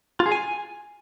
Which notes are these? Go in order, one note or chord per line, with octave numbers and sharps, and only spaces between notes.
F4
G#4
G#5